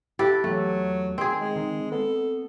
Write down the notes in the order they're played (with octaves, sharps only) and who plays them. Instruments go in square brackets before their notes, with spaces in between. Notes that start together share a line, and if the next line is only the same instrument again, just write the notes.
[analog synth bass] E4 [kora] G4 A4 B4
[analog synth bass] E2 [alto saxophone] F#3 [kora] A3
[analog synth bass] D#3 [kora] C4 G#4
[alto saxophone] G#3
[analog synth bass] D#3
[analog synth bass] B3 [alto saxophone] A4